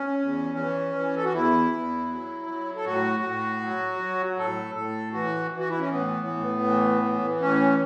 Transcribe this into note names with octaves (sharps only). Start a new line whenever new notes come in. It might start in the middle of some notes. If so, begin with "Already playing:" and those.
Already playing: C#4
E2
E3
E3
A4
F#4
E2 E4
E2
F#3
F#3
A4
A2 F#4
A2
F#3
F#3
A2 A4
A2 A4
E3 F#4
E3
F#4
E4
C#4
A2 B3
A2
E3
E3
A2 C#4